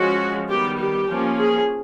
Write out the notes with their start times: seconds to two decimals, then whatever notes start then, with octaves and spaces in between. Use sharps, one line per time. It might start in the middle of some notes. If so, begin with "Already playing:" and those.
Already playing: F3 G#3 C#4 F#4
0.49 D#3 G3 B3 G4
0.79 G4
1.08 F3 A#3 C#4
1.38 G#4